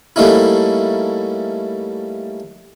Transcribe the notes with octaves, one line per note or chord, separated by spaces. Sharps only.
G3 A3 A#3 C#4 D#4 E4